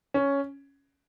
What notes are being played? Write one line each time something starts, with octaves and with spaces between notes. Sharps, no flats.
C#4